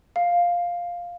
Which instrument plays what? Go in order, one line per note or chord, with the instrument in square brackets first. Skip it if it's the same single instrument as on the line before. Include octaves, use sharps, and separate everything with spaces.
[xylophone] F5